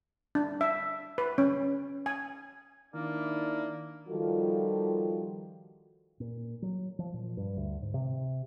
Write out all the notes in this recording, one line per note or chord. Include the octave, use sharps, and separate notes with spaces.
D4
E5
B4
C#4
G#5
D#3 A#3 D4 E4 D5
D#3 F3 G3 F4 F#4 A4
A#2
F#3
F3
A#2
G2
D2
G#2
C3